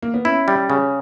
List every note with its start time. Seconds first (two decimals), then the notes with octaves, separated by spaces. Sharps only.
0.03 A#3
0.14 B3
0.25 C#4 E4
0.48 G3
0.70 C#3